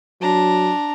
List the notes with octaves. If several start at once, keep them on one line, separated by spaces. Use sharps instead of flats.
F#3 D4 A#5